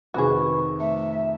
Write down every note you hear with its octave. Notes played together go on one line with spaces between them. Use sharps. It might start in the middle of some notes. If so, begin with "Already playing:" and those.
F2 C3 D#3 F#4 G#4 B4 B5 C#6
A3 E5